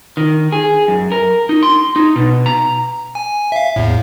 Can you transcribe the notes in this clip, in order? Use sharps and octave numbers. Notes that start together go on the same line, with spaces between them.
D#3
G#4
F#2
A#4
D#4
C6
D#4
B2
A#5
G#5
E5 F5
E2 A2